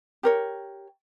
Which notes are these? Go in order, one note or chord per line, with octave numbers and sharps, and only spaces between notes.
G4 A#4 C#5